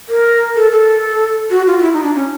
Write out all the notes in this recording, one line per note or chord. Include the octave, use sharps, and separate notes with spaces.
A#4
A4
A4
F#4
F4
F4
E4
D#4
D4
C#4